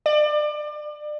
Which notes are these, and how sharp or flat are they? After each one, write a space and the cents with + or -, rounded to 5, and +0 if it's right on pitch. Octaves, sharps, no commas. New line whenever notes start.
D5 +35